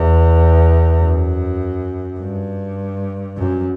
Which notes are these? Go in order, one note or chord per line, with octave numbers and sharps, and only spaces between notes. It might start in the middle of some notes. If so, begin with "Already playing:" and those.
Already playing: E2
F#2
G2
F#2